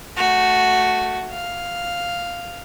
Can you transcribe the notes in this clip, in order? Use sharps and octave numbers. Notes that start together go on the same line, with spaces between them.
A3 F#4
F5